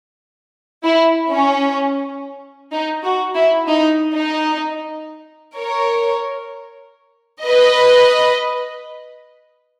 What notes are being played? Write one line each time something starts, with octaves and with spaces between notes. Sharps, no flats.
E4
C#4
D#4
F#4
E4
D#4
D#4
A#4 C#5
B4 D#5